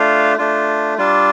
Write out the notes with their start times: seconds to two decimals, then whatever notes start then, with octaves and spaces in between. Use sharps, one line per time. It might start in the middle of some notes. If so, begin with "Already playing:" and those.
Already playing: A3 D4 F4 F5
0.38 A3 D4 F4
0.98 G3 D4 F4